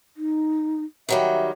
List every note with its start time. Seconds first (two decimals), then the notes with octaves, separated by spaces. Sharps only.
0.17 D#4
1.09 D#3 F#3 G3 E5